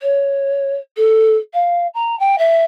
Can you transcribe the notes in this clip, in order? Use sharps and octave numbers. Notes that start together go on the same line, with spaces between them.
C#5
A4
F5
A#5
G5
E5